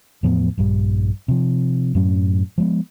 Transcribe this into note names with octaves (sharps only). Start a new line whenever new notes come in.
E2 A2 F3 B3
A#1 G2 G3
C3 F3
F#2 A2 F#3 C#4
F3 G#3 B3